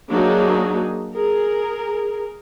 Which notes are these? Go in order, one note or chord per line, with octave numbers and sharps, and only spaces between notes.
F#3 A#3 D4 D#4 F#4 G#4
G#4 A#4